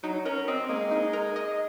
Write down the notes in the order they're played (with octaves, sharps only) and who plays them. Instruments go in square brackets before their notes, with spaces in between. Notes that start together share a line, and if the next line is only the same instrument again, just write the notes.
[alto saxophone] F#3 [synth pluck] D#4
[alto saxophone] C#4 [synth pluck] A#4
[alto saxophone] C4 [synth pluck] D#5
[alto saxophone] G#3 [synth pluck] A#3
[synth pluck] D#4
A#4
D#5